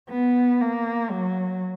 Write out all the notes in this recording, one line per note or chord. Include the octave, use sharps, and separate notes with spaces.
B3
A#3
F#3